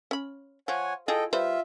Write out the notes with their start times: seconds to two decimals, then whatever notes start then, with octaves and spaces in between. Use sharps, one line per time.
0.11 C#4 B5
0.68 F3 C#5 F#5 G#5
1.08 E4 F4 G#4 A4 D#5 G5
1.33 G3 F4 B4 C5 E5